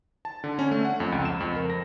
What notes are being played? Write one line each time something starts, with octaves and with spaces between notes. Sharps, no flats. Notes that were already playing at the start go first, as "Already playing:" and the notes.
A5
D3
C#4
A3
F#5
F2
C#2
E7
F2
A#4
A#6